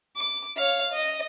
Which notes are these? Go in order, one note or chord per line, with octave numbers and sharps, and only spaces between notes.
D6
C#5 F5
D#5